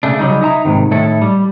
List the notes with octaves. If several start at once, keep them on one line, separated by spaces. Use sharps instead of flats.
C#3 A3 D4
C#3 F#3 G3 D#4
D#4 E4 A5 A#5
G#2 C3 D#3
A2 D#3 E4 A4
G3